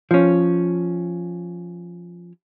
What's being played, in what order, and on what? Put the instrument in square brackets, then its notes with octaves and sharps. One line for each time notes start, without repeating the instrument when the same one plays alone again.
[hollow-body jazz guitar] F3 C#4